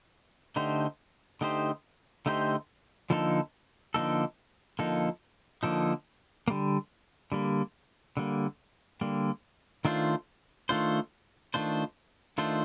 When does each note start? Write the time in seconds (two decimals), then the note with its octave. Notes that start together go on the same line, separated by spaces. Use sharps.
0.56 D3 A3 D#4 G4 C5
1.41 D3 A3 D#4 G4 C5
2.26 D3 A3 D#4 G4 C5
3.10 D3 F3 A#3 D#4 A4
3.94 D3 F3 A#3 D#4 A4
4.79 D3 F3 A#3 D#4 A4
5.63 D3 F3 A#3 D#4 A4
6.48 A#3
6.50 D3 G3
7.32 D3 G3 A#3
8.17 D3 G3 A#3
9.01 D3 G3 A#3
9.85 D#3 A3 D4 F4 C5
10.69 D#3 A3 D4 F4 C5
11.54 D#3 A3 D4 F4 C5
12.38 D#3 A3 D4 F4 C5